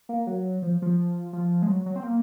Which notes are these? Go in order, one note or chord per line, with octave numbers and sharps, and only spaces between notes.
A#3
F#3
F3
F3
F3
G#3
F#3
F#3
C4
A#3